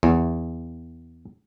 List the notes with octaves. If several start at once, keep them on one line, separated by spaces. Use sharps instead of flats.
E2